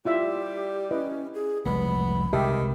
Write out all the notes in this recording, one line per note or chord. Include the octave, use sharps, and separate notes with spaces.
G3 E4 F4 G4 E5
C#4 E4 B4 D#5
G#4
F1 C2 G#3 B3 B5
C2 D#3 G#3 G4 E5 A5